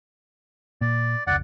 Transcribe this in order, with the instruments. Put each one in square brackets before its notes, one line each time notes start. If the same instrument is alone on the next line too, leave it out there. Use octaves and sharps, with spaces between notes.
[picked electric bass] A#2 [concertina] D5
[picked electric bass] F1 C#2 [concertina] D5 F#5